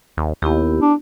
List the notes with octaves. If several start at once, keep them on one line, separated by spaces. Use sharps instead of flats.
D#2
D#2 B3 E4 G4
D4